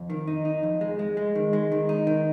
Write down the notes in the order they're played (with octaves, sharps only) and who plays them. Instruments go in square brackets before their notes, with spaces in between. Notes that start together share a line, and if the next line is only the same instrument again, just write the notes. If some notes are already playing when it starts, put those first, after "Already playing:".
Already playing: [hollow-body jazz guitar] F2
D#3
D#4
D#4
F2
G#3
G#3
G#3
D#3
G#3
D#3
D#4
D#3